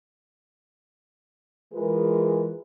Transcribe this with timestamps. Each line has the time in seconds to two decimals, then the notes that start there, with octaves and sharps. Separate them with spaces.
1.73 E3 G#3 F4 G#4 A#4 B4